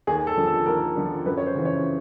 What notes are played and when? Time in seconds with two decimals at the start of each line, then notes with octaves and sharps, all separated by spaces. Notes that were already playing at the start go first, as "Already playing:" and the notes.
0.07 D#2 G#4
0.27 A4
0.37 D3 F3
0.47 A4
0.66 D#2 A#4
0.96 D3 F3
1.25 F#2 B4
1.37 C#5
1.46 C5
1.55 C#3 E3
1.65 C#5